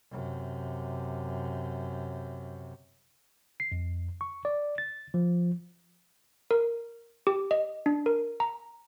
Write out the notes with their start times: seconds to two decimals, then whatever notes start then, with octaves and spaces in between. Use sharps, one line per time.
0.11 F#2 C3
3.60 C7
3.72 F2
4.21 C#6
4.45 D5
4.78 A6
5.14 F3
6.51 A#4
7.27 G4
7.51 D#5
7.86 D4
8.06 A#4
8.40 A#5